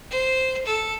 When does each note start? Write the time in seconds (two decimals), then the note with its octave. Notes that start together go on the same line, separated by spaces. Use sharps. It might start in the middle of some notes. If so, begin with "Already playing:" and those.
0.11 C5
0.66 A4